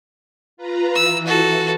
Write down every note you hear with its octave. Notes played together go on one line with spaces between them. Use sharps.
F4 B4 A#5
E3 E6
F#4 A4